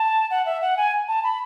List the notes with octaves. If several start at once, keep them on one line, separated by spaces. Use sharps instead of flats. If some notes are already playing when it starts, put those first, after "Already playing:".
Already playing: A5
F#5
E5
F#5
G#5
A5
B5